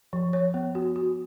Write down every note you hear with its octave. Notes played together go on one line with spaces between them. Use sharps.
F3
C#5
B3
F#4
F#4